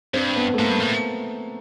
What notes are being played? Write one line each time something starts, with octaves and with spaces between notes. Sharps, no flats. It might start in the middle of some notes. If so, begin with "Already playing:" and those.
G2 C4
B3
A3
G#2 A#3
G2
A2